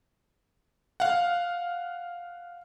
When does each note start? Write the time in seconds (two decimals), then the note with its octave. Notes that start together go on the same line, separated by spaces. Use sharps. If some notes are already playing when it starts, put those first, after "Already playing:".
1.00 F5 F#5